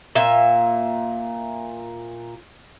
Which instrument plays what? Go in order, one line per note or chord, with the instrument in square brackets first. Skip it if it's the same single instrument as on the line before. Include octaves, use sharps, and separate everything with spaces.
[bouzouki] A#2 E5